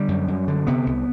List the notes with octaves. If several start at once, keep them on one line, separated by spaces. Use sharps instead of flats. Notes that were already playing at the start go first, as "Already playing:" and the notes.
Already playing: D3 G3
F#2
F#2
D3
C3 B3
C2